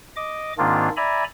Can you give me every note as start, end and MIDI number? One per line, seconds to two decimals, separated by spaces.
0.16 0.53 75
0.16 0.53 86
0.58 0.89 44
0.58 0.89 51
0.58 0.89 58
0.58 0.89 60
0.58 0.89 62
0.58 0.89 65
0.97 1.24 74
0.97 1.24 76
0.97 1.24 80
0.97 1.24 82
0.97 1.24 83